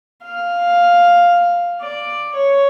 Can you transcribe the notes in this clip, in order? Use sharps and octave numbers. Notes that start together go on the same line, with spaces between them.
F5
D5
C#5